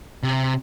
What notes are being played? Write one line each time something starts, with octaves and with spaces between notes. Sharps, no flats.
C3